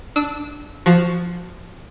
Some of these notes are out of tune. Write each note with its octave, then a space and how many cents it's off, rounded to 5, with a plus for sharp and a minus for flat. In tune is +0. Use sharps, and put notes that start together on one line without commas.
D4 +0 E6 -30
F3 +0 F#4 +0